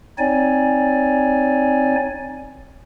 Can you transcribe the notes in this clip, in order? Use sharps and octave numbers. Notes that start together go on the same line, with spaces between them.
C4 D#4 C#5 D5 G#5